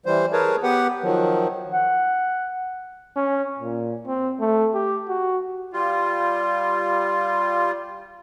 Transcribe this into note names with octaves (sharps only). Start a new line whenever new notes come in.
E3 G3 C5
G#4 A#4 B4 C#5 A5
B3 G4 B4 F#5
D#3 F3 F#3
F#5
C#4
A#2
C4
A3
G4
F#4
G3 F4